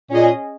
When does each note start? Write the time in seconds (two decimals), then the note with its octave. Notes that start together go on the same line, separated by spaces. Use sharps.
0.10 A#2 C#4 G#4 D#5